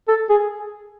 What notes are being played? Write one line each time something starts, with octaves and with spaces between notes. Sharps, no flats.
A4
G#4